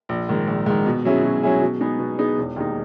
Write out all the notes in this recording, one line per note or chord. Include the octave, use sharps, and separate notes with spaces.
A#1
G#2 D#3
A#1
G#2 D#3
B2
F#3 C#4 E4 G#4
B2
F#3 C#4 E4 G#4
B2
G#3 B3 D#4 G#4
B2
G#3 B3 D#4 G#4
E1
D#2 D#3 G#3 D#4